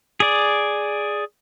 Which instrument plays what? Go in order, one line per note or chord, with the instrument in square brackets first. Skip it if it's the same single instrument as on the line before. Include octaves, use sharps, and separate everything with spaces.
[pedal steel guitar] G#4 D5